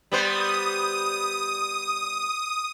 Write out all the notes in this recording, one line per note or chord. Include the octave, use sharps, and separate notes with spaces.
G3 B3 C5 D#6